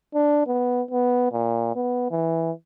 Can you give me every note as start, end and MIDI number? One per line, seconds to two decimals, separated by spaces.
0.14 0.44 62
0.47 0.82 59
0.91 1.30 59
1.32 1.73 46
1.76 2.08 59
2.11 2.51 52